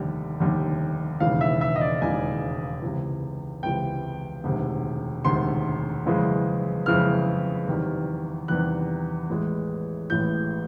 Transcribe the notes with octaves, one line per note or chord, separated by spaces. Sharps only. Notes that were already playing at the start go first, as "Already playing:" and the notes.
Already playing: F1 D#2 D3 G3
F1 D#2 D3 G3
E1 D#2 C#3 E3 F5
E5
E5
D#5
D5
E1 D#2 C#3 E3 G#5
C#2 C3 E3
C#2 C3 E3 G5
E1 D2 C3 D#3
E1 D2 C3 D#3 C6
F#1 F2 C#3 E3 G#3
F#1 F2 C#3 E3 G#3 F6
E2 C3 D#3 G3
E2 C3 D#3 G3 F#6
A1 A2 E3 G#3
A1 A2 E3 G#3 G6